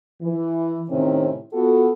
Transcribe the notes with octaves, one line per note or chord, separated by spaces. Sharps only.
E3
A2 C3 D#3 C4 C#4 E4
B3 F4 F#4 A4